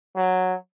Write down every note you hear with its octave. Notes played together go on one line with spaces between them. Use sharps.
F#3